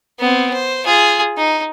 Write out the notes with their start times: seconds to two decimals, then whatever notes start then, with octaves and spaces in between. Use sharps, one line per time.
0.20 B3 C4
0.54 C5
0.85 F4 G#4
1.38 D#4